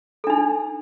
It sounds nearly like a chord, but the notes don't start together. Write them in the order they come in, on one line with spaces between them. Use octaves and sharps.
A4 D4 D#4